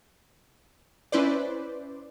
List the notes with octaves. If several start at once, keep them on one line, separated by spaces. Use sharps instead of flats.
C#4 E4 B4 C5 D5